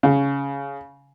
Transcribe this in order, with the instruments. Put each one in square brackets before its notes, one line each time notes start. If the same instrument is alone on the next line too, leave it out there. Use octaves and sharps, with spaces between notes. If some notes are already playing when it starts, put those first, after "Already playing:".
[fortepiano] C#3